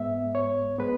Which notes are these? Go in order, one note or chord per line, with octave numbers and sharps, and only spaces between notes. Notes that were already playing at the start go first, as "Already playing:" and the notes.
Already playing: G#2 G#3 B3 E5
C#5
G#3 B3 B4